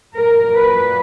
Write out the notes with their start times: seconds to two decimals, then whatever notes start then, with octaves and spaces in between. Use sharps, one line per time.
0.14 A#2 F#3 A#4
0.55 B4